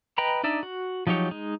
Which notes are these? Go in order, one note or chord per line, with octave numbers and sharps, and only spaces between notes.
B4 D#5 G5 A#5 B5
D4 D#4 D5 E5
F#4
F3 F#3 D#4 G4 C#5
G#3 D#4